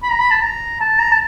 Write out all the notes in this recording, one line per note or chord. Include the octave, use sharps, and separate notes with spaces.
B5
A#5
B5
A5
A#5
A5
A#5
A5